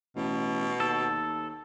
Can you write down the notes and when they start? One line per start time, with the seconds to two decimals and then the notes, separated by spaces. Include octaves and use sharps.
0.16 A1 B2
0.80 D#2 A4